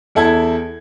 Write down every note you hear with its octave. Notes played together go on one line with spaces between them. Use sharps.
E2 E4 A4 G#6